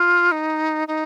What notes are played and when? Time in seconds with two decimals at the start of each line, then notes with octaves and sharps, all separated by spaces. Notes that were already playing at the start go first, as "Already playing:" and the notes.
Already playing: F4
0.32 D#4
0.88 D#4